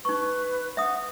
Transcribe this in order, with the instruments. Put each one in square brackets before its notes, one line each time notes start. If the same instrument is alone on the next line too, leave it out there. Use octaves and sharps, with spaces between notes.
[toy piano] D#4 C#6 [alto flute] B4
[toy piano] E5 D#6 [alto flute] F#5